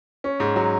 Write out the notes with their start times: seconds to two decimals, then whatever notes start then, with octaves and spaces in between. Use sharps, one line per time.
0.24 C#4
0.40 G#2
0.56 F#3